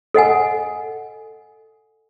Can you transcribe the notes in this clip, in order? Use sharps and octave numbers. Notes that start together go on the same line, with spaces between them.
A4 D#5 F#5 G#5